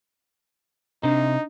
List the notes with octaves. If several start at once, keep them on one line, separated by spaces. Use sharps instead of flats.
C3 D4 D#4